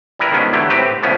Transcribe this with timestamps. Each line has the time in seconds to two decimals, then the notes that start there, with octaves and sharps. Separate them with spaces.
0.19 G3 E4 A#4 B4
0.31 D#3 F3 G#3 B3 C#4 D4
0.53 D3 E3 F#3 A3 G4
0.70 A2 C4 G4 B4
1.03 C2 A2 F3 B3 C#4